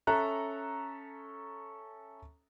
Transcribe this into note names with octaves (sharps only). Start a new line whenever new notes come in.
C#4 A4 E5 A#5 F#6